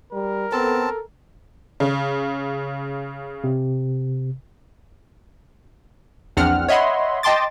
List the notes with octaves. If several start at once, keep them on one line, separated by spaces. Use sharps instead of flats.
G3 A#4
B3 C4 A4 A5
C#3
C3
A#1 E2 C4 D4 F#5 F6
C#5 D#5 E5 F#5 B5 C6
D#5 G5 A5 C6 D6 A6